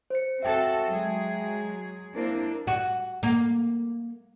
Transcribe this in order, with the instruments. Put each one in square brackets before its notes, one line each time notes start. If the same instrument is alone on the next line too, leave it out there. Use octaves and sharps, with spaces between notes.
[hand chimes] C5 C#7
[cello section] C4 F#4 A4 [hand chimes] E5 G5 A5
[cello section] F#3 G#3 G#4
[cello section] A#3 C4 D4 [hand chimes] E4 A#4
[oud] F#4
A#3